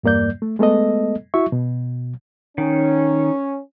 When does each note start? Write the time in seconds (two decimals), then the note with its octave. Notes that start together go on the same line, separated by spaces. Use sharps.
0.04 E2 G2 A#3 D5 G6
0.42 A3
0.59 G#3 A3 B3 A4 D#5
1.34 E4 F#4 E5 C#6
1.52 B2
2.58 D#3 C#4